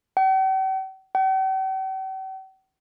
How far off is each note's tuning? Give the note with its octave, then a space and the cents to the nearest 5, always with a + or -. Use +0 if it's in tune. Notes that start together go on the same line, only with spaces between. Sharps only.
G5 -45
G5 -45